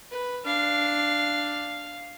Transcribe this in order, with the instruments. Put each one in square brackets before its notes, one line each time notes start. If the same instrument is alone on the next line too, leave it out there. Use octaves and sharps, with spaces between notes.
[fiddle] B4
[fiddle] D4 [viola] F5